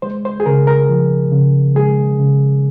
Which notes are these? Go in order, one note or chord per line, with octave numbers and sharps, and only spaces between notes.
G#3 C5
C5
G#4
C#3 A#4
A#4
F3
C#3
G#3 G#4
C#3